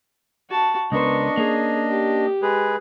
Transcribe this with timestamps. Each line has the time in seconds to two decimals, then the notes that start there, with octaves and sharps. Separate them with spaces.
0.49 F#4 A5
0.92 C#2 B3 D4 A#4 C5 D#5 C#6
1.37 A#3 C#4 G#4
1.88 G4
2.42 G#3 G#4 B4